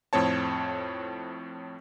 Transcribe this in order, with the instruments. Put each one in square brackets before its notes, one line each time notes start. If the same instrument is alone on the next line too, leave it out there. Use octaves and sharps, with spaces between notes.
[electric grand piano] F2 A2 C4 C#5 A5